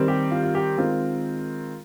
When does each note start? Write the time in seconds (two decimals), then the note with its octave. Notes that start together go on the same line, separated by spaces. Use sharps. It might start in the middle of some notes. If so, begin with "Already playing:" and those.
Already playing: D#3 G3 C4
0.08 G4
0.31 F4
0.43 F4
0.55 G4
0.78 D#3 G#3 C4 F4